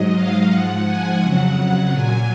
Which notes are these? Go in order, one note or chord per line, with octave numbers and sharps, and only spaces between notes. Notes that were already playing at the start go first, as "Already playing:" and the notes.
Already playing: G#2 F#3 D#5
F5
G#2 F3 F#5
G#5
F2 C#3 F#3 F#5
F#5
A#2 F#3 G#5